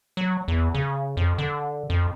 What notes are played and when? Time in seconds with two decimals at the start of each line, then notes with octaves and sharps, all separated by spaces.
0.17 F#3
0.48 E2
0.74 C#3
1.17 F2
1.38 D3
1.90 F2